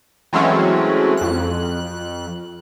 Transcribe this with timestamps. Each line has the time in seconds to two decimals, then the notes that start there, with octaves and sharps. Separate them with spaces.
0.33 E3 F#3 G#3 A3 C4 C#4
1.17 F2 F#6